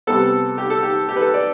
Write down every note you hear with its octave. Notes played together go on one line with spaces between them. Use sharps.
C3 G3 B3 A4
G4
A4
G4
G4
B4
A4
D5